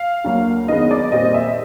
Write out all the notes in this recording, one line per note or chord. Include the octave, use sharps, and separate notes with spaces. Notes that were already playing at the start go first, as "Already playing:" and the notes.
Already playing: F5
D2 D3 F#3 A#3
F#2 D#3 G#3 B3 D#5
D5
A#2 G3 C4 D#5
E5